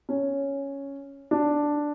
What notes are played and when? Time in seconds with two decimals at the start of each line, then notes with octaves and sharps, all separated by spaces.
0.09 C#4
1.31 D4